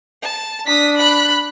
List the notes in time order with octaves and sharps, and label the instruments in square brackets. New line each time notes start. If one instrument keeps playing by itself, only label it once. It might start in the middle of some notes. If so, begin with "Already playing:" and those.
[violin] A5
[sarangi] D4 [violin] D#6 B6
[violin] B5 F#6